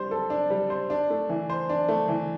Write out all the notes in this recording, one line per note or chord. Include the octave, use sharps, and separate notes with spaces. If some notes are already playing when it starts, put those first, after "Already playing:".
Already playing: G3 D4 C5
A4
D4
G3
C5
D4
A3
E3
C5
D4
A3
E3